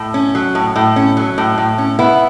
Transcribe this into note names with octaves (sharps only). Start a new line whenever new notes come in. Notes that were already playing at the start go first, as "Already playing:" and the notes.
Already playing: A2
C#4
F#3
A2
A2
C#4
F#3
A2
A2
C#4
B3 E4